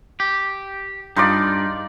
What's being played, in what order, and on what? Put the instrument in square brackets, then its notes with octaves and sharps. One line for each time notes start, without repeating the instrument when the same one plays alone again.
[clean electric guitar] G4
[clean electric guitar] G2 [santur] D#4 F4 D5